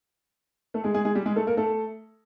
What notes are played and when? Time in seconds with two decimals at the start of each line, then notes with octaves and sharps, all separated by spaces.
0.74 A3 A4
0.84 G#3 G#4
0.94 G#3 G#4
1.05 G#3 G#4
1.15 G3 G4
1.26 G#3 G#4
1.36 A3 A4
1.47 A#3 A#4
1.57 A3 A4